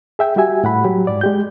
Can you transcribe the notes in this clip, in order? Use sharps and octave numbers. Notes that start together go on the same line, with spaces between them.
G#4 E5 G5
G3 F#4 G4 E5 G#5
A2 F#5 B5
F#3 G4
G#2 D5
G#3 G4 G6